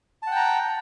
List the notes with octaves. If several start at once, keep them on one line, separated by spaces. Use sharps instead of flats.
F#5 G5 A5 A#5